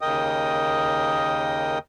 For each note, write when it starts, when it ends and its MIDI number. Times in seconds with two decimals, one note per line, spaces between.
0.01 1.79 39
0.01 1.79 49
0.01 1.79 70
0.01 1.79 75
0.01 1.79 79
0.01 1.79 87